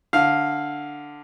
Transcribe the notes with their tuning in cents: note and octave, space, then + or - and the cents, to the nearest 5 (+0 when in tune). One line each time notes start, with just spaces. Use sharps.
D3 +0 F5 +0